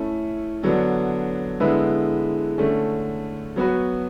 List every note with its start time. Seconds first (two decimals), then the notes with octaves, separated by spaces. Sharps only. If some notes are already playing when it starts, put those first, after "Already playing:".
Already playing: A3 C#4 E4 A4
0.63 D3 F#3 B3 D4
1.60 D3 G#3 B3 E4 B4
2.58 D3 A3 C#4
3.56 F#3 B3 F#4 B4